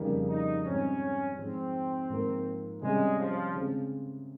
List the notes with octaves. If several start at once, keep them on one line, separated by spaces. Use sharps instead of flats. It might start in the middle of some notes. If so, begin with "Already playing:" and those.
Already playing: F2 C#3 G3 A#3 D#4
D#4
G#2 G3 C4 C#4 D#4
G#2 F3 G#3 C4 D#4
G#2 F3 A#3
C3 G3 G#3 C#4
F3
C#3 G#3 C4